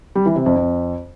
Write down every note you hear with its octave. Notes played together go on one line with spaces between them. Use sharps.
G3
E3
C3
F2
F2